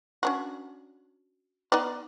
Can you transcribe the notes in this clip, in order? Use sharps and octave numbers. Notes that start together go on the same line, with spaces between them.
C#4 D4 F#4
B3 D#4 D5